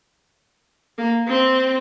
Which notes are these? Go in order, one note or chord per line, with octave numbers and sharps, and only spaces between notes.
A#3
C4